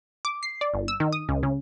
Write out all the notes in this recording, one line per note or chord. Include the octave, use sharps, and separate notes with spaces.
D6
C7
D5
G1
E6
D#3
D#6
C#2
C#3